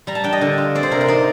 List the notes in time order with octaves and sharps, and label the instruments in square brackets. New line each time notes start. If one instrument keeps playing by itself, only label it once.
[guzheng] G3 A#5
A5
D4 G5
D#5
D3
F4
C4 D5
C5
C3 A#4
C5
D#4 D5